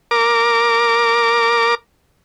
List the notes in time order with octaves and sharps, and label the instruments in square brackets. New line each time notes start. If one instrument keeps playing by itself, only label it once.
[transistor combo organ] A#4 D6